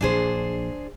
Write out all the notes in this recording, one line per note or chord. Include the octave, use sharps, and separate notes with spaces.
A#1 F3 D4 G#4 C5